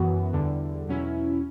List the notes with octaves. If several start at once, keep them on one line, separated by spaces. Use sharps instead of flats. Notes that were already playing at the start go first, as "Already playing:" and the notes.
Already playing: F#2 E3 B3 F#4
E2 D3 G3
E2 B2 F#3 C#4 E4